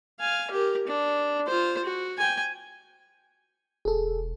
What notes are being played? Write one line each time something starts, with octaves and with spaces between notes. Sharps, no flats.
F5 G#5
G4 A#4
D4
F4 C5
F#4
G5 G#5
E1 G#4 A4